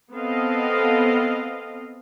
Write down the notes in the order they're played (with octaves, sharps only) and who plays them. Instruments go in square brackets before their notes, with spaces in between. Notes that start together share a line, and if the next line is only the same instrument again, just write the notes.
[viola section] B3 C4 A4 D#5 F5